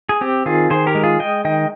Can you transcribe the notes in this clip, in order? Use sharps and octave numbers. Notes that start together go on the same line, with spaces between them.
G#4
C4 G4
D#3 F4 G#4
D#3 G#4 C5
G4 A#4
G#3
F4 G#4
G#3 D#5 G5
D#3 D#5 G5